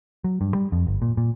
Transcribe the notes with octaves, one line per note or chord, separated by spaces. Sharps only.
F#3
G2
G3
F2
G1
A#2
A#2